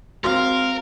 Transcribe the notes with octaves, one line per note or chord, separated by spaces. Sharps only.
G#3 C4 F#4 A#4 F5